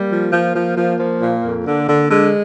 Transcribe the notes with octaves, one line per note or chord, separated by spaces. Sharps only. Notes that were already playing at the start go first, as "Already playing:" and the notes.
Already playing: G3 A#3
F3
F3
F3
F3
F3
A#2
F2
D3
D3
D3 G#3